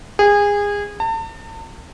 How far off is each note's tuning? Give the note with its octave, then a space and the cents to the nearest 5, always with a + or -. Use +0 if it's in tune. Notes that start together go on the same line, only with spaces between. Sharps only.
G#4 -25
A5 +40